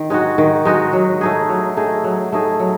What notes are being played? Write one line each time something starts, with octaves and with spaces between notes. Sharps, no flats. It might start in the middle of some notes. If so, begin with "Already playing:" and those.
Already playing: D#3
G#3 D#4 F#4
D#3
G#3 D#4 F#4
F#3
A3 D#4 G#4
F#3
A3 D#4 G#4
F#3
A3 D#4 G#4
F#3